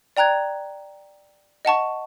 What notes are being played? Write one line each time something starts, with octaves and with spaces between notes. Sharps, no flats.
D5 G5 A#5 F#6 G#6
D#5 F#5 A5 C#6